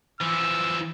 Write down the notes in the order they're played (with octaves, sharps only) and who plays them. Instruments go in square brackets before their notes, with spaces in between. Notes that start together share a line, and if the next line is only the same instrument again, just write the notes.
[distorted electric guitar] E3 F3 [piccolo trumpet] E6